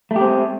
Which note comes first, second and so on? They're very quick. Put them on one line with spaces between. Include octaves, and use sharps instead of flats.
A3 G4 C4 G#3